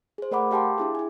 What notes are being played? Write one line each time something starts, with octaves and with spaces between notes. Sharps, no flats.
G#4 C5
A3 A#4 D5 F#5 B5 D6
G4 F5 G5 A5 C6 D6
D4 E4 G#4
E4 G#5